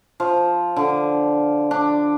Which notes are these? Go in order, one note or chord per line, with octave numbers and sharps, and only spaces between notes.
F3
D3
D4